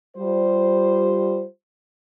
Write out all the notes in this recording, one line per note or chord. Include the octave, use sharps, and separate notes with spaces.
G3 F4 C5